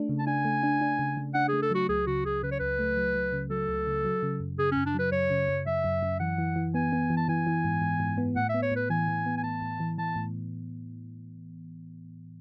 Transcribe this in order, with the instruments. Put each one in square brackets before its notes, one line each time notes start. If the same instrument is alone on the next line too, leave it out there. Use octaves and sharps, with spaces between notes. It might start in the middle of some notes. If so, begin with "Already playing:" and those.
Already playing: [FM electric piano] A3 D4
C#3
[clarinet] A5
[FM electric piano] D4 [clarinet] G#5
[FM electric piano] A3
D4
D4
C#3
C#3
[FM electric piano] D4 [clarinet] F#5
[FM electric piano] A3 [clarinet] G#4
[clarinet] A4
[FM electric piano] F#3 [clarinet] F#4
[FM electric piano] C#2 [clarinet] G#4
[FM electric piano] C#3 [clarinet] F#4
[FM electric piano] C#2 [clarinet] G#4
[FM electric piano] C#3 [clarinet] B4
[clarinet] C#5
[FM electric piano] C#2 [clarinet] B4
[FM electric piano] A3
F#3
F#3
C#3
[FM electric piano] F#3 [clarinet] A4
[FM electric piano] C#2
C#3
F#3
C#3
F#2
[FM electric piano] C#3 [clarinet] G#4
[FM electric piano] F#2 [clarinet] C#4
[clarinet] D4
[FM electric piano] F#3 [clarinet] B4
[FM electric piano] F#2 [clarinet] C#5
[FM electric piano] C#3
F#2
[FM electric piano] F#2 [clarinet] E5
[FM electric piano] F#2
F#2
[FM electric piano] E3 [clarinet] F#5
[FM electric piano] E3
E3
[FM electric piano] B3 [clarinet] G#5
[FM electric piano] B3
E3
[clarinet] A5
[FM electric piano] E3 [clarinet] G#5
[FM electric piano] E3
G#2
G#2
G#2
B3
[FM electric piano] A2 [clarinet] F#5
[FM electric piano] B3 [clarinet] E5
[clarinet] C#5
[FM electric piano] A2 [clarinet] B4
[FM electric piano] E3 [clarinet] G#5
[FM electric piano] E3
B3
[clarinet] G#5
[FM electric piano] A2 [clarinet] A5
[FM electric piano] A2
E3
[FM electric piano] E3 [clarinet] A5
[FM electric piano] A2